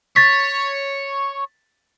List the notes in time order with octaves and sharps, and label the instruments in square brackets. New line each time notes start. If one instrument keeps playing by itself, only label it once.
[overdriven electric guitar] C#5 [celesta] A6 B6